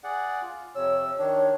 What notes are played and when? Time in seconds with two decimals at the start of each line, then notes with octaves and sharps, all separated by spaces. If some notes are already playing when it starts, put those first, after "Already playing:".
0.04 G#4 D5 F#5
0.42 F4
0.75 F2 C3 C#5 E6
1.19 D#3 D4 C#5